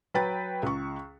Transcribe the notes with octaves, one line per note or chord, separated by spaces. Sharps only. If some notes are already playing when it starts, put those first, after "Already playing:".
F#3 B4 G5 A6
C#2 C#6